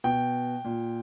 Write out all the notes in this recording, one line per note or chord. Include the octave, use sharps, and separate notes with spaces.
B2 G5
A#2